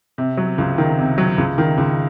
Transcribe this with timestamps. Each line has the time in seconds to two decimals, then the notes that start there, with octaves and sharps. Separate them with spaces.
0.18 C3
0.37 F#3
0.58 C#2
0.78 D#3
0.98 C3
1.18 F#3
1.38 C#2
1.58 D#3
1.78 C#2